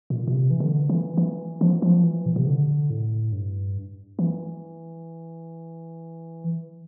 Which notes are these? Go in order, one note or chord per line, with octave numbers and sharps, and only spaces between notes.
A#2
A#2
C3
E3
D3
E3
E3
F3
F3
E3
A#2
C3
D3
A2
G2
E3